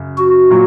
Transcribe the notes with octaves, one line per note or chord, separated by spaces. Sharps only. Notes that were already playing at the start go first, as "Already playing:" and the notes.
Already playing: F#2 C#3
F#4
A#2 F#3